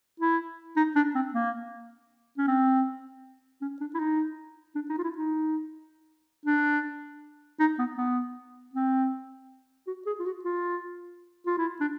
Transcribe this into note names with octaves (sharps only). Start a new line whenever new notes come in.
E4
D#4
D4
C4
A#3
C#4
C4
C#4
D4
E4
D#4
D4
D#4
F4
E4
D#4
D4
D#4
B3
B3
C4
F#4
G#4
F4
F#4
F4
F4
E4
D4